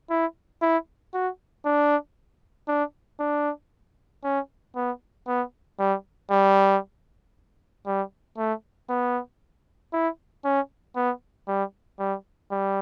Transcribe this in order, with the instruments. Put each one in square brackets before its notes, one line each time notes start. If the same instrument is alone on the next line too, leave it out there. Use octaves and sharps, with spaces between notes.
[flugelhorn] E4
E4
F#4
D4
D4
D4
C#4
B3
B3
G3
G3
G3
A3
B3
E4
C#4
B3
G3
G3
G3